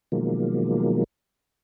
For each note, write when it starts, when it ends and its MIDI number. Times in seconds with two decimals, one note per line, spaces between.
0.12 1.04 47
0.12 1.04 51
0.12 1.04 53
0.12 1.04 54
0.12 1.04 56
0.12 1.04 58